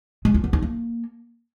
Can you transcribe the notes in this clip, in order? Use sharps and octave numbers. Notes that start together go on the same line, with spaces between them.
G#3
F4
B3
D#4
A#3